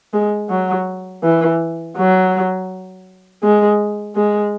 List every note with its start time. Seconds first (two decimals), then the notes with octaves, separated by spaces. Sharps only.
0.13 G#3
0.50 F#3
1.23 E3
1.97 F#3
3.43 G#3
4.16 G#3